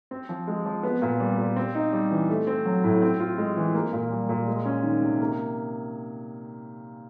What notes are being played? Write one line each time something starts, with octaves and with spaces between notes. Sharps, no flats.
C4
F3
G#3
F3
B3
A#2
G3
A#2
C4
D#4
G3
E3
A3
C4
F#3
A2
C4
F4
G#3
E3
A#3
A#2
G3
A#2
G#3
C#4
D#3
C3
A#3